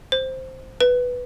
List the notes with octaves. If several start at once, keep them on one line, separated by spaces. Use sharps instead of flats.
C5
B4